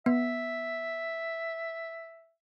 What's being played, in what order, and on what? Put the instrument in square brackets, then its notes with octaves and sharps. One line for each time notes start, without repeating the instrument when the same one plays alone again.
[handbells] B3 [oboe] E5